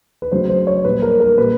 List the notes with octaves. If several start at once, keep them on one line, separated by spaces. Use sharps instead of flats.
B4
C#3 F#3 A3 C5
C5
C#5
A#2 G3 B4
A#4
A#4
A#2 G3 B4